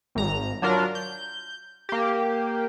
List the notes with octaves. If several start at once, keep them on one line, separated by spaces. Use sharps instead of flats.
G#1 A#5
F#3 D4 F4 A#4
G6
A#3 G4